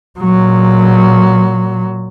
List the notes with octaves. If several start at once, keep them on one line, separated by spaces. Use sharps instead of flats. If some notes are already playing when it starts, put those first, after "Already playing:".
A#2 F#3